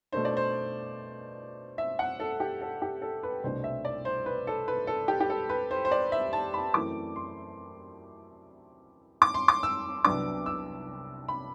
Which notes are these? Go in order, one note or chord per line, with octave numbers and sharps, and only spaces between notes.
B2 A3 D4 C5
D5
C5
E5
F#5
A4
G4
A4
G4
A4
B4
C2 B2 A3 D4 C5
E5
D5
C5
B4
A4
B4
A4
G4
G4
A4
B4
C5
C5
D5
E5
A5
B5
F#2 E3 A3 C4 E4 D6
C6
D6
C6
D6
E6
C2 C3 F#3 B3 D4 D6
E6
B5